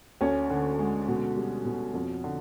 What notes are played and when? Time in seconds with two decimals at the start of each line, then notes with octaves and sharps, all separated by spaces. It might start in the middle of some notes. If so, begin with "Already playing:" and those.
0.21 D2 C#4 C#5
0.50 D3
0.79 G#3
1.08 B2
1.36 G3
1.65 B2
1.94 F2
2.24 D3